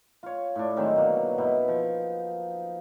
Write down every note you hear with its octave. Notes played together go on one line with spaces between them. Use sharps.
F4 C#5
A2 D4
D#3 F#3 G#3 C4
B2 D3 A#3
B2 D#4 E4
F3